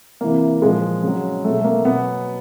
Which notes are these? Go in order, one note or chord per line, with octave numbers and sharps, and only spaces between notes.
C3 E3 A#3
A#2 F3 G#3
C#3 F#3
B2 F#3 A3
A3
A#3
B2 F#3 B3